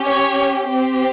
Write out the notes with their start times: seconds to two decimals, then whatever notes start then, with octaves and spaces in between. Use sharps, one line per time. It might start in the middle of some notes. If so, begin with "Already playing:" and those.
Already playing: C#4 G4
0.09 C#5
0.67 C4 G4